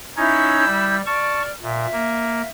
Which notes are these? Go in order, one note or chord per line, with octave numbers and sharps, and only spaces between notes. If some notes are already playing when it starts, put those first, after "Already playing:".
C#4 D#4 E4 C#5 E6 G6
G3
D5 A5 C#6 F6
A#2 E5
A#3